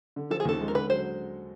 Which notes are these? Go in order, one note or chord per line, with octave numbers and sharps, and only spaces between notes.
D3
F3 A4
G#4
D#2 A4
G#3
A#4
D3 B4
F#3 C5